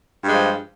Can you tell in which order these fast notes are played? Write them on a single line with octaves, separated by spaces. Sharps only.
G2 G#3 F3